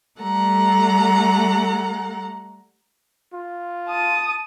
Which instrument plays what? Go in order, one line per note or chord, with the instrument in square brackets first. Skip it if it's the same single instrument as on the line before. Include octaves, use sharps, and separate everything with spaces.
[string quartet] G3 A3 A4 F#5 A#5
[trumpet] F4
[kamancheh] A5 D#6